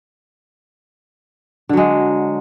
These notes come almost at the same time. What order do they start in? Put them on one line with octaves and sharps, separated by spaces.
D3 F#3 G#3